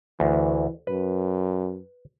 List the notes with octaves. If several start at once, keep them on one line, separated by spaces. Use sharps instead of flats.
D2 E3
F#2 B4